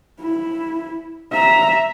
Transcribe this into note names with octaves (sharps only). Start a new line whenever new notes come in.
E4
E5 A#5